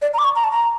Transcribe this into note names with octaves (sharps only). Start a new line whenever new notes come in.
D5
A#5
D6
C#6
A#5
A5
A#5